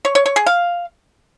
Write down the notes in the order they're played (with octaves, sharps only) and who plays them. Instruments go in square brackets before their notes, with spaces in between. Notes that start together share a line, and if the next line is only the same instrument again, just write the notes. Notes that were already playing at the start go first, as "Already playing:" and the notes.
[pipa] C#5
C#5
C#5
G#4
F5